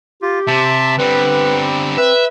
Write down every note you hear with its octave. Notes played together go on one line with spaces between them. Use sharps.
F4 G4
C3 E5 A5
D3 G3 C4 B4
B4 E5